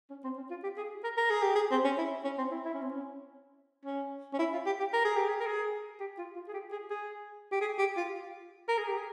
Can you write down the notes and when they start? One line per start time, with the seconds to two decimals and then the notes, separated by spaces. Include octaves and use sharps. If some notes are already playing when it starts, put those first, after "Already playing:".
0.10 C#4
0.24 C4
0.37 C#4
0.51 F4
0.63 G4
0.77 G#4
1.04 A#4
1.17 A#4
1.30 G#4
1.43 G4
1.55 G#4
1.71 C4
1.84 C#4
1.98 E4
2.24 C#4
2.38 C4
2.51 E4
2.65 E4
2.73 C#4
2.82 C4
2.89 C#4
3.85 C#4
4.33 C#4
4.39 E4
4.53 F4
4.66 G4
4.79 G4
4.93 A#4
5.05 G#4
5.17 G4
5.29 G#4
5.40 A#4
5.46 G#4
6.00 G4
6.18 F4
6.36 F4
6.48 G#4
6.54 G4
6.72 G#4
6.90 G#4
7.52 G4
7.61 G#4
7.79 G4
7.97 F4
8.68 A#4
8.78 G#4
8.88 G4
8.98 G#4